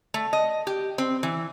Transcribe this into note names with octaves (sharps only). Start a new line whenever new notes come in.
A3
D#5
G4
C4
E3